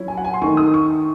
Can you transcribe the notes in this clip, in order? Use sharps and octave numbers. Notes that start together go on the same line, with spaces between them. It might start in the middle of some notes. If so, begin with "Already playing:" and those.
Already playing: F#3 C#4 E4
G#5
F#5
G#5
C6
D#3 A3 D#4 C#6
D#6
C#6